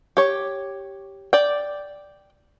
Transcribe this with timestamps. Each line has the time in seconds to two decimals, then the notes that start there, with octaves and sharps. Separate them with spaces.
0.17 G4 C#5
1.33 D5 G5